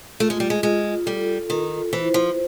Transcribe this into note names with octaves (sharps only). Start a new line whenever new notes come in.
A3 F4
G#3
G3
G#3
G#3 F4
G3 A4
D#3 F4
E3 C5
F3